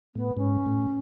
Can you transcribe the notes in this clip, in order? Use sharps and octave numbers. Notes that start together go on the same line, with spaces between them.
A2 B3
G#2 C#4
A2